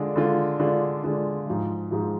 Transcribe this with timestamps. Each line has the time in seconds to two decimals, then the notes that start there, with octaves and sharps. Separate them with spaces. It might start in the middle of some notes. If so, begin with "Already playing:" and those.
Already playing: D3 G#3 D4 F4
0.16 D3 G#3 D4 F4
0.59 D3 G#3 D4 F4
1.03 D3 G#3 D4 F4
1.47 G#2 F3 G#3
1.91 G#2 F3 G#3